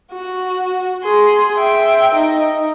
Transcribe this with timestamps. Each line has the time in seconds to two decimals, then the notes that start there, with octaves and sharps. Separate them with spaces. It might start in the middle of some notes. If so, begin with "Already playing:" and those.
0.13 F#4
1.04 G#4 C6
1.58 E5 G5
2.15 D#4